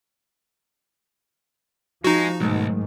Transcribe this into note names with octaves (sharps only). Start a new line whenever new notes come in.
F3 G#3 D#4 F#4
B1 G#2 D#3 F#3 G#3 A3